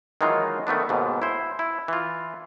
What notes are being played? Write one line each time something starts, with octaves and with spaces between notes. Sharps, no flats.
D#3 E3 F#3 G#3 D#4 F4
D#3 A3 B3 D4
D#2 G#2 B2
E4 C5
E4
E3 F4